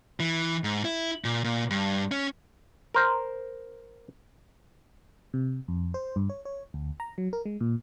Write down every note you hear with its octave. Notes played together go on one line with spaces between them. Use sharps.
E3
G#2
E4
A#2
A#2
G2
C#4
A#4 C5
C3
F2
C5
G2
C#5
C#5
D2
A#5
F#3
A#4
G#3
A#2